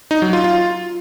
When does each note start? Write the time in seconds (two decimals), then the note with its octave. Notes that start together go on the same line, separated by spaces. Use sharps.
0.11 D#4
0.22 F#3
0.33 F4
0.44 F4